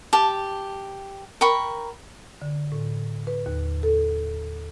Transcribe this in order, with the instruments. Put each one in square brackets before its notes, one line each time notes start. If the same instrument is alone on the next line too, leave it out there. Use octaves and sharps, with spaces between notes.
[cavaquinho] G4 A5
A#4 G5 B5 C#6
[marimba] D3
A2
B4
D#2
A4